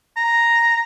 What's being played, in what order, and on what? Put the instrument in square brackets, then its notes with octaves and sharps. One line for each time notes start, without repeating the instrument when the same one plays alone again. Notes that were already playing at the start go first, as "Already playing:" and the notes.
[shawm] A#5